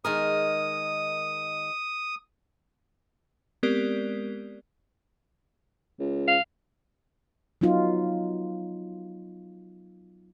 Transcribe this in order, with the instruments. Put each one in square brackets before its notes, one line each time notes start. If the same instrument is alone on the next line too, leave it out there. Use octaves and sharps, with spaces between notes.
[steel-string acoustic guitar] D#3 G#3 A#4 [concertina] D#6
[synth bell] G#3 B3 C4 G4 A#4 D5
[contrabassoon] C#2
[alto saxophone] F5
[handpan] F#3 B3 D#4 F4